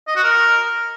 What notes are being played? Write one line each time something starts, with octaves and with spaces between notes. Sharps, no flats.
D#5
F#4
A#4